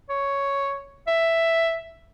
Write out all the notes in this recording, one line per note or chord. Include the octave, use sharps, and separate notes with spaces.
C#5
E5